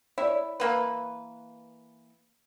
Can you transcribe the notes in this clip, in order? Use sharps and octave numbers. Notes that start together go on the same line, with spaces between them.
E4 C#5 D5
E3 A#3 B4